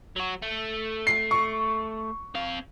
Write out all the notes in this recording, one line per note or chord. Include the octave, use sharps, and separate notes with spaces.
F#3 F#4
A3
C7
C#6
C4 F5